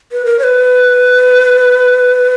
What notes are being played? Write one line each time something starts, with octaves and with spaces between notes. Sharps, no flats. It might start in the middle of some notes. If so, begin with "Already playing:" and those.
B4
A#4
C#5
B4